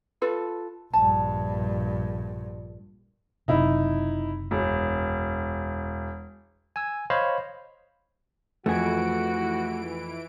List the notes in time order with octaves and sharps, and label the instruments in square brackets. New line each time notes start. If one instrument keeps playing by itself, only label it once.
[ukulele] F4 A4 B4
[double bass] A#1 G2 [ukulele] A5
[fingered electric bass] F#1 C3 [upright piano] D#4 E4
[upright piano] E1
[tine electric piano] G#5 E6
C5 C#5 D#5 F5 B5
[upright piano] F2 [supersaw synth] E3 D7 [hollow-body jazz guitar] A3 G#4 [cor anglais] F#4